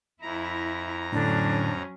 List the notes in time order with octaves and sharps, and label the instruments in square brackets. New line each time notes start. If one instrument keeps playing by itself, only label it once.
[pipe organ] F2 A#5 [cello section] E4
[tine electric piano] A2 D3 [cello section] F#3 C#4 [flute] D4